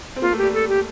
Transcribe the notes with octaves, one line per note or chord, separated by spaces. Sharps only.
C4
A#3 F4
A3
G4
G3
A4
G4